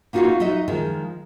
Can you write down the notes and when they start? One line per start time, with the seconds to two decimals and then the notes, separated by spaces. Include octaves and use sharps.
0.13 A#3 D#4 F4 F#4 E5 F5
0.40 D#4 F#4 D#5 E5
0.68 D#3 F3 G#3